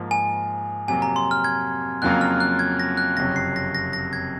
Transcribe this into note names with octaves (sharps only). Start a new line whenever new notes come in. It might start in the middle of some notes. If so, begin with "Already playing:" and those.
Already playing: G#2 F3 A#3
G#5
F2 C3 F#3 A#3 G#5
A#5
C6
F6
G#6
F2 C#3 F#3 A#3 F4 F#6
F6
F#6
G#6
A#6
F#6
F#1 F2 C3 F#3 C#4 A#6
C7
A#6
A#6
A#6
G#6